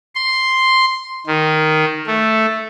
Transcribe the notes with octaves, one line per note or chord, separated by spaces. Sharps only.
C6
D#3
A3